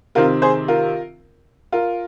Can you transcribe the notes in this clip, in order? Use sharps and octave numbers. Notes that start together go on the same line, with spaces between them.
C3 D#3 C4 F4 A#4
G#4 C5
F4 A#4
F4 A#4